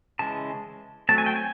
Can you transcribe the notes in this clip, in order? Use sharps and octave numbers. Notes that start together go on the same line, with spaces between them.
C#3 E3 G#3 A5
F#3 A3 C4 A5
G#5
G5
G#5